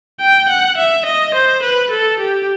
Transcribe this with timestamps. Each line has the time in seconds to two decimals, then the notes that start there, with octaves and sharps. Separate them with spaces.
0.20 G5
0.49 F#5
0.78 E5
1.06 D#5
1.35 C5
1.63 B4
1.91 A4
2.20 G4